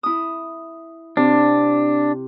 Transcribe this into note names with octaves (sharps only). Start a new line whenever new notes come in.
E4 D#6
C3 D4